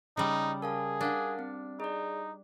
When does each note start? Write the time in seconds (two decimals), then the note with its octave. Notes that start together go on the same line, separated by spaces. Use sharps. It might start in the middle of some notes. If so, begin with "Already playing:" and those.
0.17 C#3 G3 D#4
0.62 G#4 A#4 F5 A5
1.01 D4 A#4 F5 F#5
1.39 C4
1.80 D#4 G#4 D5